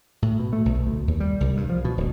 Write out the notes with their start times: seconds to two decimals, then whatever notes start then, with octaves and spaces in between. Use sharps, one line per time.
0.22 A2
0.39 B2
0.53 A3
0.65 B1
0.87 D2
1.07 D#2
1.20 G3
1.40 C2
1.57 G2
1.70 F3
1.85 B2
1.97 D1